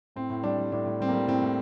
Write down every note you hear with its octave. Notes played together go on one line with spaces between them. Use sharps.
A2 C4
A2
G3 D4
G3
A2 D4
A2
G3 C4
A#3
G3
A2 C4
A2